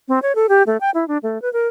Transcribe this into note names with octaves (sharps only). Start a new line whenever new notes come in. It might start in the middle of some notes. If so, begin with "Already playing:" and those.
C4
C#5
A4
G4
A3
G5
E4
D4
A3
B4
A#4